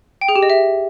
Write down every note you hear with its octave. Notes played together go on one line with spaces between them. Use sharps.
G5
G#4
G4
D#5
E5